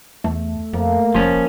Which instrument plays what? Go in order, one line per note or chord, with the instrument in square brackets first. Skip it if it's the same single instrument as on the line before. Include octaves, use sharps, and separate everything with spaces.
[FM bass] E2 [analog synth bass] A3
[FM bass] F2 [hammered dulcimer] A#3
[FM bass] F1 [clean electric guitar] F3 C#4